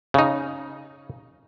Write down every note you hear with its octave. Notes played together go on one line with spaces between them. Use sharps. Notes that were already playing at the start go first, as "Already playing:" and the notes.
C#3 D#4